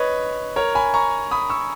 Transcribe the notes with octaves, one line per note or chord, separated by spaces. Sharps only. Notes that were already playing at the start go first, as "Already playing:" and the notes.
Already playing: B4 C#5 D#5
A#4 C#5
G#5 B5
A#5 C#6
B5 D#6
C#6 E6